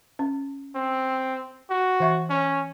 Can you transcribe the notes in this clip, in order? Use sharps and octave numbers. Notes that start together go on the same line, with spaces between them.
C#4
C4
F#4
E3 E5 C#6
C#4